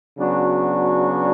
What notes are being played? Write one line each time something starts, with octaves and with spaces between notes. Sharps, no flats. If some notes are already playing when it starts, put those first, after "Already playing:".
C#3 F#3 B3 D4 F#4